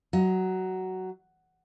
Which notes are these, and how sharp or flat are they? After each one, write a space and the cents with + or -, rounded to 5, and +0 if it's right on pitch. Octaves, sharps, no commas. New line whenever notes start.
F#3 +10 D#5 +25